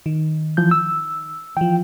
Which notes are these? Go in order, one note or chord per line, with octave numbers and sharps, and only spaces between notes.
D#3
E3 F3 G6
E6
E3 F3 G5